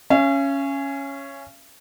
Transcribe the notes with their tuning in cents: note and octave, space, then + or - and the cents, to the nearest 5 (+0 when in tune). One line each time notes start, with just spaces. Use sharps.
C#4 +0 F5 -45